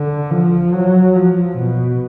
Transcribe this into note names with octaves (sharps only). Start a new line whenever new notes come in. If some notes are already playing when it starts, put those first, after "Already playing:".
Already playing: D3
F3
F#3
F3
B2